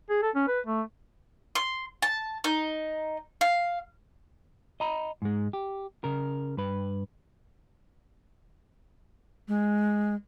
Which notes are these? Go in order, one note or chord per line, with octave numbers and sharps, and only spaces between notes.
G#4
A4
C#4
B4
A3
C6
A5
D#4
F5
D#5 A#5 B5
G#2 G#3
G4
C#3 A#4
G2 B4
G#3